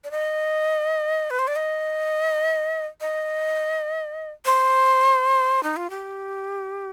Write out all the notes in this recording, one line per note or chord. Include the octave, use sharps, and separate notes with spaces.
D5
D#5
B4
C5
D5
D#5
D#5
C5
D#4
F4
G4